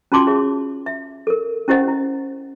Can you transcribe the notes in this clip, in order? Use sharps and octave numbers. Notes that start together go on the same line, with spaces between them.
C#4 F4 F#4 A5 C6 D6
G#4 C#5 E5
E5
A4 A#4
C#4 E4 G4 C5 D#5 F#5
E4